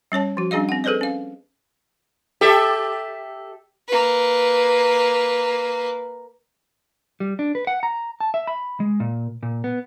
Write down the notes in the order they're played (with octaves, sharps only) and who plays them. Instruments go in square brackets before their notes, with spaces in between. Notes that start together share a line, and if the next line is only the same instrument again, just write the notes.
[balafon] G3 C#4 C#5 A5
F3 F#4
G3 C#4 D4 G#4 D#5 F5
C4 F#5
G#4 A4 B4 C5 D5 D#5
C#4 F5
[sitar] G4 A4 E5
[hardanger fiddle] A#3 B4
[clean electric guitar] G3
D4
B4
F#5
A#5
A5
E5
B5
G#3
A#2
A#2
B3